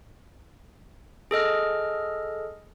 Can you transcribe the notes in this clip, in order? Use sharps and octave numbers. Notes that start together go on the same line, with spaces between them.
G#4 A4 D#5 F6